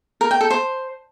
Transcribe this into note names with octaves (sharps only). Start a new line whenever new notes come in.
A#4
G5
A4
C5